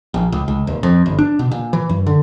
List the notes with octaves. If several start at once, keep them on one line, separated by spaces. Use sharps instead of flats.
A#1
C#2
C#2
D#1
F2
G1
D4
B2
A#2
E3
F#2
D3